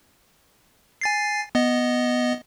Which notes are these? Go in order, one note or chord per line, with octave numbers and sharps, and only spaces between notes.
G#5 A6 C7
B3 D#5